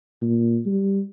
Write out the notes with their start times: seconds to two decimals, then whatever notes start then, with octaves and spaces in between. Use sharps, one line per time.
0.22 A#2
0.66 G3